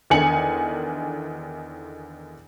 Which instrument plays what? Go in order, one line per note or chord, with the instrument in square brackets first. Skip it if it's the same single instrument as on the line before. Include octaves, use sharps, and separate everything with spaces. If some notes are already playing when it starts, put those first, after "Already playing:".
[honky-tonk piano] E2 D3 D#3 G#5 C#7 F#7